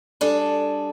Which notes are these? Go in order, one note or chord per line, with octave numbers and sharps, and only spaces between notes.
G3 D4 G#4 A4